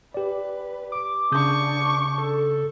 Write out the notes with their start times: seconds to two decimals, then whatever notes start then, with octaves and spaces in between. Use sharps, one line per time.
0.14 G4 B4 D5
0.92 D6
1.32 C#3 D4 C#6 D#6 G6
2.18 A4